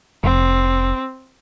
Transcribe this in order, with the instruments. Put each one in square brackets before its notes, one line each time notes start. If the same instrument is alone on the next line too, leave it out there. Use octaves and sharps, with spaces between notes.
[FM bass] F1 [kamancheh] C4